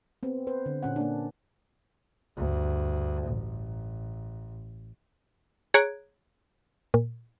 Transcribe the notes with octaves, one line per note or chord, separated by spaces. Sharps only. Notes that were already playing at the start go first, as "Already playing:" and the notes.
B3 C4
B4 C5
D3
A#2 C#4 F#5
A#3 D4
D2 G2
A1
G#4 C#5 A#5 F#6 G#6 D7
A#2